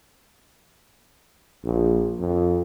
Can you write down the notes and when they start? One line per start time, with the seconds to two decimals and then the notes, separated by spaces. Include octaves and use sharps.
1.65 A#1
2.19 F2